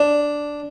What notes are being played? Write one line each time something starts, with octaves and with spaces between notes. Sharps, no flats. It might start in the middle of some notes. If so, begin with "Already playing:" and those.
Already playing: D4